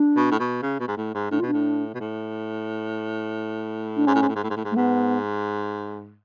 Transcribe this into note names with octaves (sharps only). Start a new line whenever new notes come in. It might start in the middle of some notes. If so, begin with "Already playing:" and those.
Already playing: D4
B2
A2
B2
C#3
B2
G#2
A2
G#2
A2 D4
B2 F4
D4
A2
B2
A2
D4
G#2 C#4
A2
G#2
A2
G#2
A2
G#2
A2
G#2
A3
G#2 B3